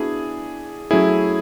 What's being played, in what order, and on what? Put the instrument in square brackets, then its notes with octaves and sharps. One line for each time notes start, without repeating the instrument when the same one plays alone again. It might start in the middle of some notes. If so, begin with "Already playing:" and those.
Already playing: [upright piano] B3 D4 F#4 [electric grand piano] E4 G#4
[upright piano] F#3 A3 C#4 [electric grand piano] E4 G#4